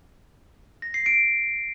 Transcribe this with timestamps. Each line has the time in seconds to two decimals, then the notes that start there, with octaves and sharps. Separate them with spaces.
0.82 A#6
0.94 C7
1.06 D7